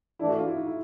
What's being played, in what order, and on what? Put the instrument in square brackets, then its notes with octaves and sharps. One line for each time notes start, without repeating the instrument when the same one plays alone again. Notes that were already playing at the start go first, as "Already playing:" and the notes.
[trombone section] E3 A3 D4 [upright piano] E4
[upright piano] F#4
F4
E4
D#4
E4